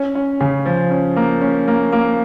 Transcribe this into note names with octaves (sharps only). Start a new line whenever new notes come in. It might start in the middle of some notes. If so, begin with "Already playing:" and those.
Already playing: C#4
C#4
C#3
F3
C#4
A#3
C#4
A#3
A#3